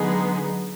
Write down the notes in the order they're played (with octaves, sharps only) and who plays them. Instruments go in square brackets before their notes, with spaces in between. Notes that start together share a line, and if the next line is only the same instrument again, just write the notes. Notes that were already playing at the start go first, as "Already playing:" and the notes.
Already playing: [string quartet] D3 F#3 B3 D#4 G#4 [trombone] G#3